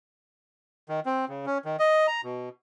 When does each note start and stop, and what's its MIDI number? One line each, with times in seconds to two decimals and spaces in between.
0.89 1.00 51
1.06 1.25 60
1.29 1.46 49
1.46 1.58 61
1.65 1.76 51
1.79 2.07 75
2.07 2.21 82
2.24 2.49 47